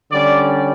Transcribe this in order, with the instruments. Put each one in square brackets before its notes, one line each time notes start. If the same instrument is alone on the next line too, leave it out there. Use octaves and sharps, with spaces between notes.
[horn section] D3 G3 C#4 D5